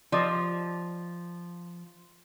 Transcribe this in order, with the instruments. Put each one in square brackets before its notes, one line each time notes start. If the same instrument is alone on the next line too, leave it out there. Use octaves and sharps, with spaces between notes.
[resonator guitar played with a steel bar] F3 [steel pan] D5 D#5 D6